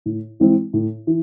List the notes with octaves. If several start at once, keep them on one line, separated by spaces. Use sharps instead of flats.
A2
E3 G#3 C4 E4
A2
E3